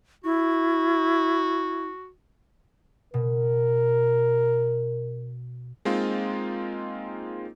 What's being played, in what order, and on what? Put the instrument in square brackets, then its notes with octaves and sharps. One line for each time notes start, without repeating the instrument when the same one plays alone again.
[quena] E4 [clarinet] F#4
[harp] B2 [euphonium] A#4
[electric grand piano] G#3 A#3 C4 D#4 F4